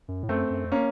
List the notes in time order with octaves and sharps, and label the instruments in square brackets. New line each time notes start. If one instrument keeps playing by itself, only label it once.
[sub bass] F#2
A2
[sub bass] F#2 [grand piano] A3 C4
[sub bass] F#2
F2
[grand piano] A#3 C#4